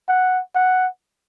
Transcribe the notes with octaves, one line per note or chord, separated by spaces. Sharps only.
F#5
F#5